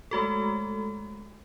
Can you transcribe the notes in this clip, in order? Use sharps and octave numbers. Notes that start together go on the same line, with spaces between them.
G#3 A3 F#4 A4